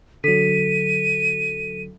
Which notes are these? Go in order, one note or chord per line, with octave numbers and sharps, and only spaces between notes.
D3 F#3 A4 B6 D#7